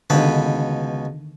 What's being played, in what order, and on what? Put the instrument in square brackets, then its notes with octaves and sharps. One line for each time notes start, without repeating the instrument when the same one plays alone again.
[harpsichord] C#2 B2 B4 [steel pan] D3 D#3